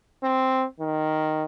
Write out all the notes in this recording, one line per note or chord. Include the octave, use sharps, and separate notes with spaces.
C4
D#3